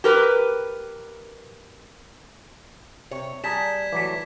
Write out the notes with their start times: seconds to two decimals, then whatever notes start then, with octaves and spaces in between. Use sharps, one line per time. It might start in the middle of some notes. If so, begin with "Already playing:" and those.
0.04 G4 A#4 B4
3.11 C3 C#5
3.44 G3 G#4 A5 A#5 G#6 B6 E7
3.93 E3 F#3 A3 D6 B6